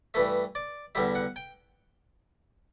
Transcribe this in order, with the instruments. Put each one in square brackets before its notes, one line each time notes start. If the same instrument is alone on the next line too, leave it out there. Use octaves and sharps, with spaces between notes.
[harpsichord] G2 E3 A3 E5
D5
E2 D3 G3 E5
F#5
G5